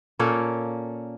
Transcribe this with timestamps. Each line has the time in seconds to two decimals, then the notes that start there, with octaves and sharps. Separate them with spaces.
0.19 A#2 A#3 C#4 A4